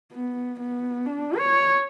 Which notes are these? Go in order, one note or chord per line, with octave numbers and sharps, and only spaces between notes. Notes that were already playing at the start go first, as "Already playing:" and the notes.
B3
B3
D4
C#5